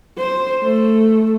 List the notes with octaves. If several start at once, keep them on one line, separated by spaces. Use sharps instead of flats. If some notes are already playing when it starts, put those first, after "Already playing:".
C5
A3